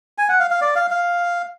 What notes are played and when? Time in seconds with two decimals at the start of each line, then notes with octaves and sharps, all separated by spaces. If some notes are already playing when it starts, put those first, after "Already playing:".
0.18 G#5
0.29 F#5
0.40 F5
0.51 F5
0.61 D5
0.76 F5
0.90 F5